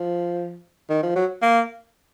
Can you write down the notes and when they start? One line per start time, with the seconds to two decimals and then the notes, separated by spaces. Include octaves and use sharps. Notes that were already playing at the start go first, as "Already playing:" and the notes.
Already playing: F3
0.89 D#3
1.03 F3
1.15 F#3
1.42 A#3